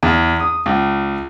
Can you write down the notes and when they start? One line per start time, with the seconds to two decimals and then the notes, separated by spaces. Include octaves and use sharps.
0.03 E2
0.40 D#6
0.66 C#2